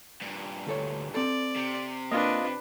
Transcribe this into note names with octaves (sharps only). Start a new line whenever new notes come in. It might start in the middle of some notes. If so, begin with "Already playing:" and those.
G2 A#2
D2 A4 C#5
C4 A4 D5
C3
A#3 D4 F4 B4 D#5